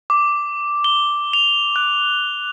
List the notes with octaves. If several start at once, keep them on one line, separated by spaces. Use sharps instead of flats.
D6
G7
F7
F#6